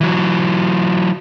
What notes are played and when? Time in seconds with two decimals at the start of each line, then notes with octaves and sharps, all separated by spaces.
0.01 E3 F#3